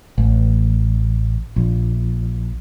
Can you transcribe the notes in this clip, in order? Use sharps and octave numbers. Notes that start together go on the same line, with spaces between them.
A1
A#1